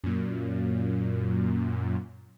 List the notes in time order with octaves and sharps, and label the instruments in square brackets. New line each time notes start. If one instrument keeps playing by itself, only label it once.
[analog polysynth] F#2 A#2